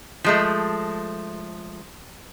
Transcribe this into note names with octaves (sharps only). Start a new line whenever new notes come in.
F3 G#3 A3